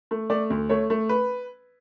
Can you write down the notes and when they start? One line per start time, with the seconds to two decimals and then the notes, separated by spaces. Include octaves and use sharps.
0.11 A3
0.30 A3 D5
0.50 D2
0.69 A3 C#5
0.90 A3
1.09 B4